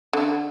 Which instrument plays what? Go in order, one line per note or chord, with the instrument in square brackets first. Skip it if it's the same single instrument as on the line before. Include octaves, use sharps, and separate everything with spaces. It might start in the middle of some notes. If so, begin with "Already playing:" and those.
[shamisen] D3